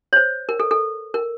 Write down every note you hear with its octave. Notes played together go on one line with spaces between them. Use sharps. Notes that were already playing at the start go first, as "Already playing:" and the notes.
C#5
C5
A#4
A4
A4
A#4